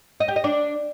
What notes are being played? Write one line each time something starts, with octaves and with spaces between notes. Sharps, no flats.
D#5
G4
D#5
D4